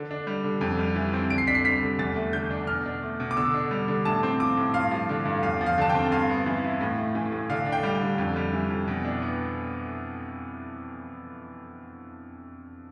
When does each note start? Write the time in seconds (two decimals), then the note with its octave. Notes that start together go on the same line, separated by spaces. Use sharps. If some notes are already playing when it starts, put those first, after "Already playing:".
Already playing: D3
0.11 D4
0.27 G3
0.44 D3
0.61 F2
0.79 G3
0.96 E3
1.13 C4
1.30 D3 D7
1.38 C7
1.47 D4 B6
1.55 C7
1.64 G3 B6
1.83 D3
1.99 E2 A6
2.16 A3
2.33 D3 G6
2.51 D4
2.67 B2 F6
2.86 D4
3.02 A3
3.20 B2
3.31 D6
3.37 D3 E6
3.54 D4
3.71 G3
3.88 D3
4.05 A2 A5
4.23 C4
4.40 F3 D6
4.57 A2
4.74 G2 F5
4.91 F3
5.09 D3
5.25 G2
5.43 E2 F5
5.61 F3
5.66 F5
5.78 D3 A5
5.89 G5
5.95 C4
6.11 G2 F5
6.29 B3
6.46 E3
6.64 E4
6.81 A2
6.98 A3
7.15 E3
7.32 A2
7.49 D3 F5
7.66 D4
7.72 G5
7.83 G3
7.95 G5
8.01 D3
8.18 F2
8.36 G3
8.53 E3
8.70 F2
8.88 B2
9.05 D4
9.22 B3